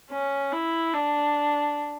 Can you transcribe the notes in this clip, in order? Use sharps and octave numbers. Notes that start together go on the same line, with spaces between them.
C#4
E4
D4